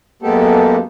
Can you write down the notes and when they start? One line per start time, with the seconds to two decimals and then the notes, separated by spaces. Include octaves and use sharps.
0.22 F#2 G#3 A#3 B3 G4 A4